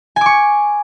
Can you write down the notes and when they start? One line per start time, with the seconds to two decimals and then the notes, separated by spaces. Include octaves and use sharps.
0.16 G#5
0.21 D6
0.26 C#6